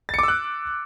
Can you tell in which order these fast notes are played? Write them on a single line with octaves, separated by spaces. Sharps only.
A6 C#7 D6 E6 F#6